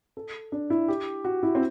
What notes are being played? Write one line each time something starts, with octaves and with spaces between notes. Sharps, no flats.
A4
D4
E4
G4
F#4
E4
C4